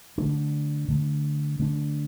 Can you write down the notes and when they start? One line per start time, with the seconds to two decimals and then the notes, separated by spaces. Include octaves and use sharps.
0.18 D3 A3 D4
0.88 D3 A3 D4
1.59 D3 A3 D4